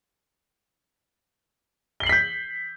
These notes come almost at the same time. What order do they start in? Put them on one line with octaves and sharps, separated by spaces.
G7 C7 F#7 B6 G6